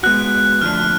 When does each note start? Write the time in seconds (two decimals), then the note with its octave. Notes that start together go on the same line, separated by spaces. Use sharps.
0.03 G#3 B3 F#4 F#6
0.61 F2 D3 F3 A3 D4 F6